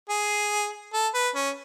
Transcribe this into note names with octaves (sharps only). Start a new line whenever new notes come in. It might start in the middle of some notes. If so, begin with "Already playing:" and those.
G#4
A4
B4
C#4